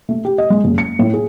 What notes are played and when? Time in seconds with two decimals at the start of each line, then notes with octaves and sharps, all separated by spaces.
0.09 A3
0.25 G4
0.38 D#5
0.50 G#3
0.64 F#1
0.78 C#7
0.99 A2
1.14 G#4